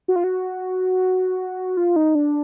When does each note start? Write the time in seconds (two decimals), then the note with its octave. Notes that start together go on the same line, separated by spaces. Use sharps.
0.08 F#4
0.16 F4
0.24 F#4
1.77 F4
1.96 D#4
2.15 D4